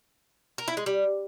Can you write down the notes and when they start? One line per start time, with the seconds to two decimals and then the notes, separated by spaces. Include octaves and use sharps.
0.58 A#4
0.68 E4
0.77 G#3
0.86 G3